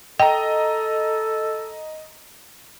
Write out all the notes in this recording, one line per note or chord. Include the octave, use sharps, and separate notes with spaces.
A4 D#5 G5 A#5